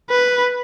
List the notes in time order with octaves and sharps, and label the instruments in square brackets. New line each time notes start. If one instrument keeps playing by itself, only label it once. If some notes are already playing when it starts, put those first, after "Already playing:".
[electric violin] B4